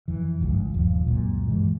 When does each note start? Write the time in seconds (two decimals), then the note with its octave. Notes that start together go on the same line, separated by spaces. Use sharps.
0.08 F2 E3
0.40 G#1 C#2 G2 F3
0.74 D#1 G2 F3
1.06 C#2 F#2 A#2
1.48 G2 E3 G#3